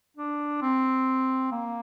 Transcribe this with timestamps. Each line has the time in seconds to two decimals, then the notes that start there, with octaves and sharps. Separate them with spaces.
0.17 D4
0.62 C4
1.52 A#3